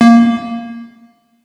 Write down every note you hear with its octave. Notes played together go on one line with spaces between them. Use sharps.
A#3